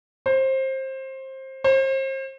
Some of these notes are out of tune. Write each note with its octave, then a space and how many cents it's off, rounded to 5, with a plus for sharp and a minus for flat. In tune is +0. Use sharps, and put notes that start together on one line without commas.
C5 +20
C5 +35